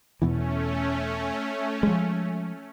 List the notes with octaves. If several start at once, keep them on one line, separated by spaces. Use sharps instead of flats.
E2 B2 E3 A3 C#4
F3 G#3